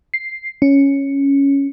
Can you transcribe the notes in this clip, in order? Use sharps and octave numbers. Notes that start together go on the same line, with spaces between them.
C7
C#4